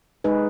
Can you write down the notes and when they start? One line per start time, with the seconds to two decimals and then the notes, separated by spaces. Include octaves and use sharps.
0.24 G#3 D#4 G#4 B4